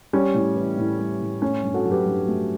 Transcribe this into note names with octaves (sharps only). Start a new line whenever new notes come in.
G3 C#4
A2
E3
A2
G3
A2
A3 C#4
G2
F#4 A4
F#3
G4 B4
G2
A3